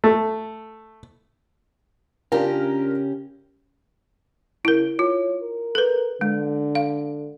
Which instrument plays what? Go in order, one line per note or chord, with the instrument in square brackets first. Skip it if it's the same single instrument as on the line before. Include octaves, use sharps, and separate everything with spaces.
[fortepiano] A3
[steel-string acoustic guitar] C#3 C#4 G4 [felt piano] D4 F4 A#4
[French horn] C#3 [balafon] E4 A#4
[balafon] F4 [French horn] C#5
[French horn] A#4
[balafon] A4 B4
[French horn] D3 [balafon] G#3
[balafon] F5